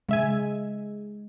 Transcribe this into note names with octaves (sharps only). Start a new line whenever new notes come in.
C#3 G#3 E5 G#5